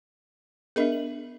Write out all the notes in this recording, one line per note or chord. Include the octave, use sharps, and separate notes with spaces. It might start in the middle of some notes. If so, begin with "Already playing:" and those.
B3 D4 G#4 A#4 D#5 E5
F#7